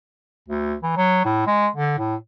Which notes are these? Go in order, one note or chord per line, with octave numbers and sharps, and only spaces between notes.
D2
E3
F#3
A2
G#3
D3
A2